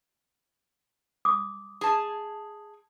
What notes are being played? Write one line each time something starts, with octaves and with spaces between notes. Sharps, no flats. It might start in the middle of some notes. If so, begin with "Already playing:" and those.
D6 D#6
G#4 A5